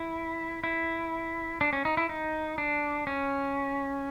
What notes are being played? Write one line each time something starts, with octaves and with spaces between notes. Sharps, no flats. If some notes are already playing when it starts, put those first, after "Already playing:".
Already playing: E4
E4
D4
C#4
D#4
E4
D#4
D4
C#4